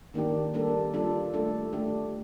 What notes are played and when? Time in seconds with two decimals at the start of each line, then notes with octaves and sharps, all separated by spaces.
0.14 D#3 A#3 D4 G4
0.54 G3 A#3 D4 A4
0.94 G3 D4 F4 A4
1.34 A3 D4 A4
1.73 A3 D4 G4